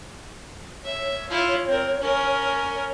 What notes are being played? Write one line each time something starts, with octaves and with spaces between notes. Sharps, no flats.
C#5 E5
E4 F4
C4 A#4
C#4 A#4
C#5